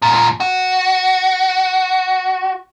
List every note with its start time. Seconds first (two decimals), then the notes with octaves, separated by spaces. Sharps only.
0.02 D#2 A#2
0.40 F#4